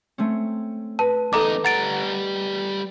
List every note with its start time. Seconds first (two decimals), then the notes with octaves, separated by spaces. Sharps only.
0.18 A3 C4 C#4
0.99 B4 A5
1.33 E2 D#4 A4 D#5 A#5 D6
1.65 G3 F#5 A#5 A6 D7